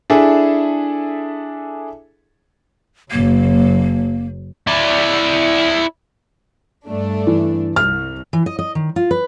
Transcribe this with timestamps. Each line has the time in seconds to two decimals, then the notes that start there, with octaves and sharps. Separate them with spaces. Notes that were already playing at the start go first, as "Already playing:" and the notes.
0.10 D4 E4 G#4 A4 E5
3.12 F#1 F#3 A#3
4.67 E4 D5
6.87 G2 A3 D4
7.27 E3
7.76 C2 F6
8.33 E3
8.46 D#5
8.59 D#5
8.75 D#3
8.96 F4
9.11 B4